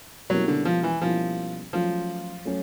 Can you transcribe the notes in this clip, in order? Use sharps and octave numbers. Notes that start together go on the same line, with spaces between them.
B2 F#3 G3 A#3 C#4 E4
D3
F3
E3
B2 F3 G3 A#3 C#4 E4
F3 F#3 A3 C#4 F4
F#3 A3 C#4